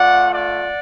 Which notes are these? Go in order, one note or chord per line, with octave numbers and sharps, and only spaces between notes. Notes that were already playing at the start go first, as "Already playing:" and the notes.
Already playing: A3 F4 D5 F#5
D5 F#5